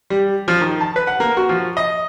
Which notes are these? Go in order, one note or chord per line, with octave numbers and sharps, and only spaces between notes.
G3
F3
D#3
A5
B4
F#5
A#3
F#4
F3
D#5